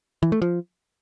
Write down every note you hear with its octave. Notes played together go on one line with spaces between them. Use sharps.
E3
A3
F3